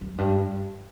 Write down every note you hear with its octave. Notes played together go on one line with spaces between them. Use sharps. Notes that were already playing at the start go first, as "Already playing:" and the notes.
F#2
G2